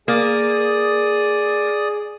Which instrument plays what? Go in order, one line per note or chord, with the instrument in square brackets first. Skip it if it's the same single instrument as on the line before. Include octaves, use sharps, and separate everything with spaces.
[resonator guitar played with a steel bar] A#3 [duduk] G#4 [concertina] D5 D#6